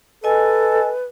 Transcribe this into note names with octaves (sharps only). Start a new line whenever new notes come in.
A4 B4 D#5 G#5